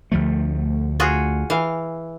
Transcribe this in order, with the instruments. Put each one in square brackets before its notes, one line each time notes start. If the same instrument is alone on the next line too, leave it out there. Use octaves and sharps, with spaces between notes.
[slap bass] D2 F3 A3
[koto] F4 F#4 G#4
E3 F5